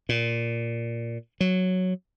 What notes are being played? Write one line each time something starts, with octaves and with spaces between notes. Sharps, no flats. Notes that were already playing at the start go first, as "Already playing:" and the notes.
A#2
F#3